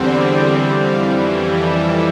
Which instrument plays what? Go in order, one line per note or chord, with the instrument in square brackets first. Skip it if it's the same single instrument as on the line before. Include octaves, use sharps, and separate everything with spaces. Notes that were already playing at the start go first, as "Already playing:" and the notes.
Already playing: [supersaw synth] E2 D3 G3 C4
F2 E3 G3 F5
A4